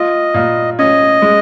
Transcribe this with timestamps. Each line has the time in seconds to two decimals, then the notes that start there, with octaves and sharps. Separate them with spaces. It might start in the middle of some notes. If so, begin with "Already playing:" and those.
Already playing: F4 D#5
0.34 A#2
0.79 C#4 D#5
1.22 G#3